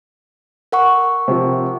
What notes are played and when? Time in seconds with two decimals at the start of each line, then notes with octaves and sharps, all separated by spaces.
0.72 A#4 F#5 C#6
1.28 C3 F3